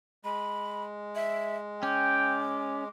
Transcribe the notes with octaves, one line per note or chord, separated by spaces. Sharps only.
G#3 B5
E5
C#4 G5 D6